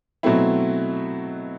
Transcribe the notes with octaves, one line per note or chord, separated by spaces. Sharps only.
B2 F#3 A3 C4 E4